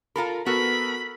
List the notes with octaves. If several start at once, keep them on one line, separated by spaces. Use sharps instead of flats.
F4 A4 A#4 A#5 B5
B3 F#4 A4 A#4 B5